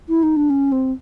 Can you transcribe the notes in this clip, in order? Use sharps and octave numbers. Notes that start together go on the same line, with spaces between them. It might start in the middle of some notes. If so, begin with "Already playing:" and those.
E4
D#4
D4
C#4
C4